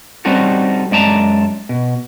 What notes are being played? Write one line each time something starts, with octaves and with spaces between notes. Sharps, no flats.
G3 C4 C#4 D#4 F#4 A4
F#2 G#3 D5 A5 A#5
B2